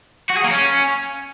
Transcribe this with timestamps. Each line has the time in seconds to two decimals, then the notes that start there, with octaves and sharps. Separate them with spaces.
0.30 F#4
0.37 G#4
0.44 A#3
0.51 C#4